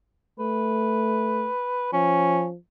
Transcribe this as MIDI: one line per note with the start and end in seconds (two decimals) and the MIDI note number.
0.39 1.49 57
0.39 1.88 71
1.93 2.56 53
1.93 2.45 61